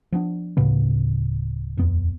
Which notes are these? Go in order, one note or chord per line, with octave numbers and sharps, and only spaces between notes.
F3 B3 D4
D1 A2 C#3 B3
D#1 F2 B3